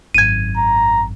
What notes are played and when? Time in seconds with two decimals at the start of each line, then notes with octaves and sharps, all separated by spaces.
0.14 G#1 F#2 G#6 D#7
0.57 A#5